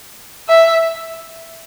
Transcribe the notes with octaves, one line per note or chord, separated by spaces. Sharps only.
E5